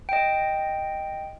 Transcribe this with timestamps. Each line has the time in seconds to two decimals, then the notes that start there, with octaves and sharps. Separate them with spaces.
0.09 D#5 G5